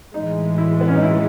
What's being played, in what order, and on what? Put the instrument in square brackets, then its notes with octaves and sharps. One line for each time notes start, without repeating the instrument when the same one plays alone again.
[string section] A2 E3 G#3 [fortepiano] D#4
[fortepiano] E4
B3
C#4
D#4
E4